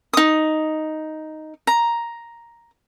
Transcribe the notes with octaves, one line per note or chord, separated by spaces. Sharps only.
D#4 D#6
A#5